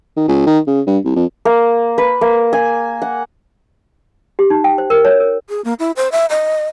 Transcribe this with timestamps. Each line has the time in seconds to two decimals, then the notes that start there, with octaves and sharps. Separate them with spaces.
0.17 D#3
0.28 C#2
0.46 D#3
0.67 C#3
0.87 G2
1.05 C2
1.16 F2
1.45 A#3
1.98 B4
2.21 A#3
2.53 G#5
3.02 F#5
4.39 G4
4.50 D#4
4.64 G5
4.78 C5
4.90 A#4
5.05 C#5
5.20 A#4
5.49 G#4
5.64 A#3
5.79 E4
5.96 C5
6.12 E5
6.30 D#5